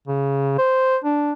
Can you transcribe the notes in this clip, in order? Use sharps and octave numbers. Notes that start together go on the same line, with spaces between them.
C#3
C5
D4